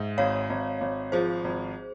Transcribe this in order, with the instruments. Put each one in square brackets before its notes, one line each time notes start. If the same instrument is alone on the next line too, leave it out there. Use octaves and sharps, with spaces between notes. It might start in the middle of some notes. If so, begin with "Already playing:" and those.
Already playing: [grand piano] G#2 [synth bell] E5
[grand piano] G#1 [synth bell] C#5 F5
[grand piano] G#1
G#1
[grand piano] F3 [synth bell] G#4 C5
[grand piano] G#1